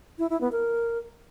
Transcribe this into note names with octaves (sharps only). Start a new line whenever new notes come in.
E4
E4
B3
A#4